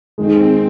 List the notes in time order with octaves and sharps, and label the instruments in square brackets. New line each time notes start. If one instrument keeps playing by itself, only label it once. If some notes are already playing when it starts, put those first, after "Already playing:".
[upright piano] D#2 D#3 G#3 [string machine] C4